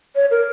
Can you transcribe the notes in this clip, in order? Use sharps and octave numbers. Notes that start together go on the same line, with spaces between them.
C#5
A#4